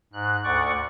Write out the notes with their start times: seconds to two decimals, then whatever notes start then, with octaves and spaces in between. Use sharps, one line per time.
0.13 G#2 F#6
0.44 D2 D5 F#5 C#6